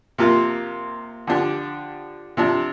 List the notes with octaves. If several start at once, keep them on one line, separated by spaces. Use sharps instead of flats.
C3 F3 A#3 F4
D3 F3 D4 G4
C3 F3 D4